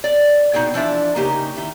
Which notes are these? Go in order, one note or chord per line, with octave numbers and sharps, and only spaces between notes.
D5
B2 D#4 G4 G#4 G5
E3 F3 D4 E5
C#3 A#3 D#4 G4 A#4
D#3 E4